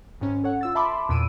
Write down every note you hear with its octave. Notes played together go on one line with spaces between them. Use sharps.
G#1 G#2 C#4
A4 C#5 F#5
F4 E6 A6
E5 A5 B5 C6 D6
E2 A#2 E6 D7 D#7